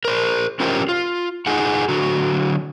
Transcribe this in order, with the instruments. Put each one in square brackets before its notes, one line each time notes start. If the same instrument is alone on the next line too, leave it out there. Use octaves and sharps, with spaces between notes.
[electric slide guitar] A#4 C5
C#4 F4 G4 A#4 C5
F4
D#4 F4 G#4 F#5
D3 F#3 F#4